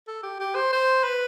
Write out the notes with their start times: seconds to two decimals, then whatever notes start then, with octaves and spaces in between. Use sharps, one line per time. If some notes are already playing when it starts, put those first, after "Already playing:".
0.07 A4
0.23 G4
0.40 G4
0.55 C5
0.72 C5
1.04 B4